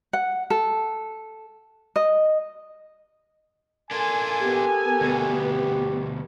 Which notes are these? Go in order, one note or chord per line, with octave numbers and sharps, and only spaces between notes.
F#5
A4
D#5
D4 F4 A4 A#4 G#5
B3 G4
D2 B2